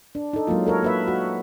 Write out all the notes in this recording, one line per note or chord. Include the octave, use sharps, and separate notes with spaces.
D4
D#4 A4
F#3 G#3 A#3 F4
A4 A#4 C#5
A#3 B4 E5
F#4